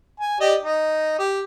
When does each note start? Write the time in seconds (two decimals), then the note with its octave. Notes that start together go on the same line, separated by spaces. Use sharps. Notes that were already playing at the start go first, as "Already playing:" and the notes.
0.20 G#5
0.40 G4 D5 D#5
0.62 D#4
1.19 G4